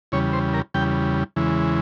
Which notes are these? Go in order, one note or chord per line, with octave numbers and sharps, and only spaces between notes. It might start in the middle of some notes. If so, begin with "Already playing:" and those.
E2 C#3 G3 C#5
C5
A#4
E2 C#3 G3 G5
E2 C#3 E3 G#3